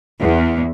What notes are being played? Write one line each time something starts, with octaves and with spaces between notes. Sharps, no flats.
E2